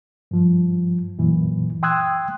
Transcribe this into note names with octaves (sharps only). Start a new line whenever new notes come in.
G2 F3
F#2 A#2 E3
G5 C6 D#6 E6 F#6 G#6